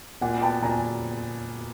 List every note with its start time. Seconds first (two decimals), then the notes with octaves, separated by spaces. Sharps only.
0.21 A#2 F#5 G#5
0.42 B3 G5 A5
0.62 A#2 G#5 A#5